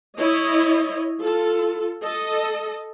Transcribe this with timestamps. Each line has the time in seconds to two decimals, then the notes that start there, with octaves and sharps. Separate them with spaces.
0.18 E4 C#5 D#5
1.19 F4 A4
2.03 A4 D#5